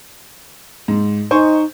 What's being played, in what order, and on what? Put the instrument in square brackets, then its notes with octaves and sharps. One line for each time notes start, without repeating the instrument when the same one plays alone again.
[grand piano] G#2
[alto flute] D#4 [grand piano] C5 G#5 C#6